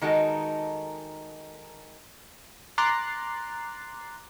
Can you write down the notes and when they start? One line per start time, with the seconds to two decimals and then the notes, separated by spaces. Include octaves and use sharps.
0.01 D#3 G#3 D#4 F#4 A4 A#4
2.78 A#5 C6 D6 F#6 A6 C7